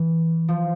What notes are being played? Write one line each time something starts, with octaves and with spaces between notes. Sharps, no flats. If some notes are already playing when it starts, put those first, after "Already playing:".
Already playing: E3
F3